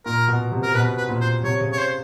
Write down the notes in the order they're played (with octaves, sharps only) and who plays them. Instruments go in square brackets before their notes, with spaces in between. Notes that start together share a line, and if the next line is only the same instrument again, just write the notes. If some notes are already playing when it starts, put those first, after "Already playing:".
[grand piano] A#2 [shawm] A#4
[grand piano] B2
C3
[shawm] A#4
[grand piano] B2 [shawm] B4
[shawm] B4
[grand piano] A#2
[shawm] C5
[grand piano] C3 [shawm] C#5
[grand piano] C#3
[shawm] C#5
C5